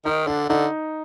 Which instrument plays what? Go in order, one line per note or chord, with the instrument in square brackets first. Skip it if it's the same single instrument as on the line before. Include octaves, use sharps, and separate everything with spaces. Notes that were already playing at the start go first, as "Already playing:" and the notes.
[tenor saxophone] D#3 [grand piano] D#4
[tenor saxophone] D3 [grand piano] D4
[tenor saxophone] D3 [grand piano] D#4